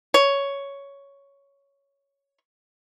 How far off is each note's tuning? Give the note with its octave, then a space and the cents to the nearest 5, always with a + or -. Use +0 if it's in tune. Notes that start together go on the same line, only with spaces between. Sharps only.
C#5 +5